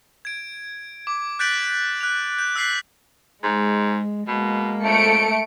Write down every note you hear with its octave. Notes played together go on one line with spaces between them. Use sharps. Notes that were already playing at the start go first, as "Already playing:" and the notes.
G#6 D7
D6
F#6 G6 A6 B6 D7 F#7
F#6 F7
G6
E6 F#6 B6 C7 F#7
G#2 G#3
B2 G#3 A#3
F2 A3 C#7 D7